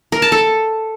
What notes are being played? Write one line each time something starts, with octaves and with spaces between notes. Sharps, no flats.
A#4
A5
A4